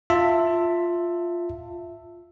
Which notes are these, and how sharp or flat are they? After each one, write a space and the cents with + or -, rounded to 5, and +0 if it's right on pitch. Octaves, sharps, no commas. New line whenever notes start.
F4 +0 E5 +0 A5 +20